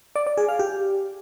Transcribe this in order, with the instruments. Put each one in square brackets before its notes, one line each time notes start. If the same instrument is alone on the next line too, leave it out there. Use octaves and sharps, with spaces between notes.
[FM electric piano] D5
D5
G#4
F5
G4